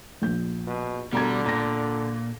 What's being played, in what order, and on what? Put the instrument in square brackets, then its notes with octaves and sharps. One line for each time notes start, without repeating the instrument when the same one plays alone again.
[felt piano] A#1 G6
[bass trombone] B2
[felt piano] B2 A#5 G#6 [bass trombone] D3 [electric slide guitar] G3
[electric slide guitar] A#2 [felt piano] A#5 A#6